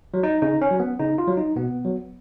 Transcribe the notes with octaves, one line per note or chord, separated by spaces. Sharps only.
F#3
D#4
C#3 D#4
C#4
F#3
B3
C#3 D#4
F4
F#3
D#4
B2 B3
F#3